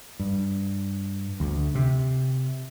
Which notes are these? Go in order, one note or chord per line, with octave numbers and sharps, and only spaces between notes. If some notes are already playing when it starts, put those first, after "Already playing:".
G2
D2
C3